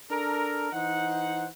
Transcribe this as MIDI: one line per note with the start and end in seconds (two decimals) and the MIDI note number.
0.11 0.70 62
0.11 0.70 69
0.11 0.70 70
0.73 1.48 52
0.73 1.48 63
0.73 1.48 72
0.73 1.48 78